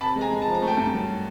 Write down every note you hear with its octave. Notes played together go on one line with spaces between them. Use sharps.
C3 A5 B5
G#3
G#5 A#5
G#3
F3 A5
A#5
A3
G5 A5
G2
F#3